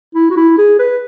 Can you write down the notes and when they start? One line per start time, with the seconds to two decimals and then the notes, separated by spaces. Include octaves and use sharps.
0.15 E4
0.30 F#4
0.37 E4
0.58 G#4
0.79 B4